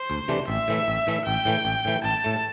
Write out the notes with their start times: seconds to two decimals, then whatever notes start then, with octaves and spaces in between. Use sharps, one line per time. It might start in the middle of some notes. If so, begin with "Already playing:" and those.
Already playing: C5
0.10 D2
0.28 C3 E3 A3 D4
0.48 A1 E5
0.68 A2 E3 A3
0.88 A1
1.07 A2 E3 A3
1.26 A1 G5
1.45 A2 E3 A3
1.65 A1
1.85 A2 E3 A3
2.04 A1 A5
2.24 A2 A3